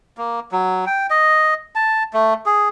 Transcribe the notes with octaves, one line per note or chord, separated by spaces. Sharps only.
A#3
F#3
G5
D#5
A5
A3
G#4